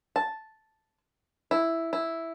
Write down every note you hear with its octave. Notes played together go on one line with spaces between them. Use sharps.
A5
E4
E4